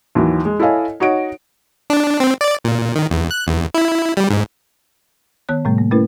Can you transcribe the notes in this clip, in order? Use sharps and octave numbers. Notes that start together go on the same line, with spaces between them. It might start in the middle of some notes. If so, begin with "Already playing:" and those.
D#2 E3 F#3
G#3
E4 A4 C#5 D#5 F5 G#5
D#4 F#4 C#5 F#5 D7
D4
C4
D5
A#2
D#3
E2
F#6
E2
E4
G3
G#2
D#3 B3 C#5 F#6
A2 C3 G3 A3
A#3
A3 C#4 E4 A#4 B4